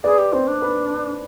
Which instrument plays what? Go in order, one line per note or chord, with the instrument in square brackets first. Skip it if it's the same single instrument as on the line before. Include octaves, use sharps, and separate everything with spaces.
[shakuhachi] G#4 [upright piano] B4 D5
[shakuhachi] G4
[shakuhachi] C4 [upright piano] C5
[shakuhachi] D4
[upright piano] B4